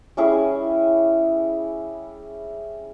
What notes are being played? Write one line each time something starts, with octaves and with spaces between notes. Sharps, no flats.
G3 C#4 E4 G#4